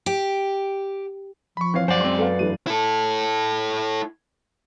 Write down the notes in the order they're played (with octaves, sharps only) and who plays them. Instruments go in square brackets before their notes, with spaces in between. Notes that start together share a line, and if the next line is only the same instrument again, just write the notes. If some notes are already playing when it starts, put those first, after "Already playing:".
[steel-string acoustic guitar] G4
[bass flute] F3 [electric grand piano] B5 C#6
[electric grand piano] E3 F5 [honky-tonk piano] C4 C#5 C7
[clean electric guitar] F#2 D5 [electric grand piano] C5 [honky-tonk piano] F5 F#5 G#5
[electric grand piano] G#3 C4 [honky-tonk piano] C6
[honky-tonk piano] A4 F5 F#5 [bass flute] B4
[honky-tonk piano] G2 E3 A3 [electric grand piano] D#7
[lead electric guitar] E4 A4